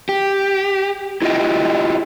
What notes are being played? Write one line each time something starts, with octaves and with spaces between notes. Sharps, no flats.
G4
E4 F4 G4 D#5 G5